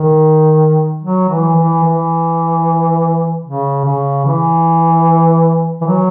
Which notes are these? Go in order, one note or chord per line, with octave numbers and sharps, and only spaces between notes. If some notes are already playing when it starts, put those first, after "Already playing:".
Already playing: D#3
F#3
E3
E3
E3
C#3
C#3
E3
E3
F#3